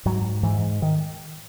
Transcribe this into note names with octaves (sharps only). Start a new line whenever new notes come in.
G#2 F#3
G#2 E3
D#3